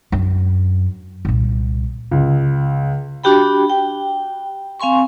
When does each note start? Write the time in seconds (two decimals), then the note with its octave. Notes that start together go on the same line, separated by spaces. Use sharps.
0.12 F#2 D4
1.25 C2 A#2
2.11 C#2
3.24 D4 F#4 G4 G5 B5
3.70 G5
4.80 C4 F5 G#5 C6 C#6